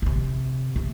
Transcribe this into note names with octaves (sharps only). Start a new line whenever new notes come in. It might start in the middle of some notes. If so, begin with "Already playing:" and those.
B2
C3
C3